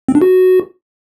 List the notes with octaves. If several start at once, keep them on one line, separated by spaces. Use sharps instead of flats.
C4
D4
F#4